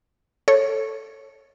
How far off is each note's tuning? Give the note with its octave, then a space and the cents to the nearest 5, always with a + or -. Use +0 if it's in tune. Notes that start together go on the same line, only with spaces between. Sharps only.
A4 +0 C#5 -15